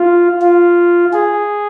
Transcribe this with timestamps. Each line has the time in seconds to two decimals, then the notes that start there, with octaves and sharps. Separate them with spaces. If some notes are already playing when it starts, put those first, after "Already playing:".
Already playing: F4
0.42 F4
1.13 G#4